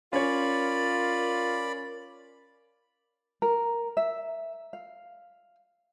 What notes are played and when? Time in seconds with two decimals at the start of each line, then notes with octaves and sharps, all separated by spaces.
0.13 C#4 F4 A#4 C#5 D5 B5
3.42 A#4
3.97 E5
4.73 F5